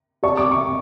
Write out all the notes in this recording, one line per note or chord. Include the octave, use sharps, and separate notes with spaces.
G4 D5 F#5 A5 C#6
D6
C#6